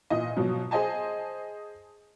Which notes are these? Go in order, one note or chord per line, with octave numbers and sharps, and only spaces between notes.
A#2 E3 D#5
B2 F3 F#3
G#4 C5 D#5 G#5 A5